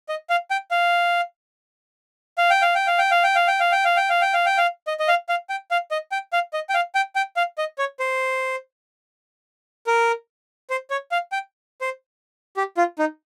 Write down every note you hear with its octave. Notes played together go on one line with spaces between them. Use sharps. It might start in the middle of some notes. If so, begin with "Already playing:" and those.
D#5
F5
G5
F5
F5
G5
F5
G5
F5
G5
F5
G5
F5
G5
F5
G5
F5
G5
F5
G5
F5
G5
F5
D#5
D#5
F5
F5
G5
F5
D#5
G5
F5
D#5
G5
F5
G5
G5
F5
D#5
C#5
C5
A#4
C5
C#5
F5
G5
C5
G4
F4
D#4